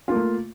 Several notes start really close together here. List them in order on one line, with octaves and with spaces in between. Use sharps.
F4 A#3 A3